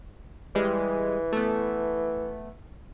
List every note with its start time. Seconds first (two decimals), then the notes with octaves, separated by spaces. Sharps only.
0.55 E3 G3 G#3
1.33 A3 B3